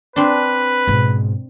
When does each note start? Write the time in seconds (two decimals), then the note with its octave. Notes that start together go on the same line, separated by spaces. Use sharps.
0.16 C4 D4 B4
0.87 G#2 B2